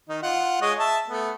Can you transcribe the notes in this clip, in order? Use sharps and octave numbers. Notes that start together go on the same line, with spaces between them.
D#3 D#4
F4 F#5
G#3 C#5 D#5
E5 A5
A3 B3